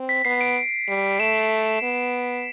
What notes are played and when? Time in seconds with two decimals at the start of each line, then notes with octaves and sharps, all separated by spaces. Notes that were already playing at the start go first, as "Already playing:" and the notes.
Already playing: C4
0.09 B6
0.25 B3 C7
0.41 D7
0.88 G3
1.19 A3 E7
1.82 B3